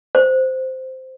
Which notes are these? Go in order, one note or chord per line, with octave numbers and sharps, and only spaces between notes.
C5